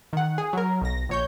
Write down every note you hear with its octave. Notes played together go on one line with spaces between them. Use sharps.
D#3 F#5
G#4
F#3 A#4
B1 A#6
A#1 C#5 G6